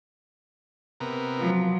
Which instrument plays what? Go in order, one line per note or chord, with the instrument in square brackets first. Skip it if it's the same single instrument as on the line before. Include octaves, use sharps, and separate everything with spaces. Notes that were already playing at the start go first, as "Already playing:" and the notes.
[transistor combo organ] C3 B3 A#4
[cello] F3 F#3